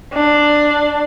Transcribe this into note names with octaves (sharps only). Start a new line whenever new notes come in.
D4